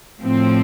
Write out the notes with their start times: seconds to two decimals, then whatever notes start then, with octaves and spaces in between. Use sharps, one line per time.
0.22 A2 F3 C4